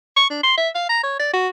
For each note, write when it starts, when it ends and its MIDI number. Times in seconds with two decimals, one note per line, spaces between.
0.16 0.26 85
0.30 0.43 62
0.43 0.54 84
0.57 0.69 76
0.75 0.85 77
0.89 0.99 82
1.03 1.14 73
1.19 1.31 74
1.33 1.48 66